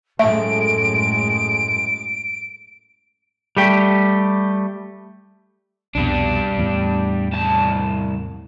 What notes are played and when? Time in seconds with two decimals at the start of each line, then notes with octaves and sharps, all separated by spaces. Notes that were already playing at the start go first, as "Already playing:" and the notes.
0.19 F#2 A2 G#3 A3 E5 D7
3.57 G3 A3 G4
5.95 C2 F2 B2 G3 D4
6.58 E2 A2
7.34 C2 A5